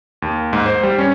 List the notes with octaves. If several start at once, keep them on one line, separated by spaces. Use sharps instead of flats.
D#2
G#2
C5
G3
C#4